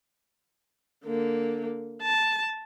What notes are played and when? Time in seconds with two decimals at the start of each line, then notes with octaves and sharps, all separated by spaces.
1.05 D3 A#3
2.02 A5